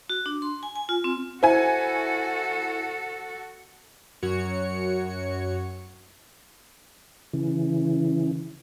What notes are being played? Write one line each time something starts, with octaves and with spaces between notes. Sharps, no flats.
F#4
D4
C6
G#5
G#5
F4
C4
E4 F#4 A4 C5 G#5
F#2 F#4 C#5 C#7
C#3 E3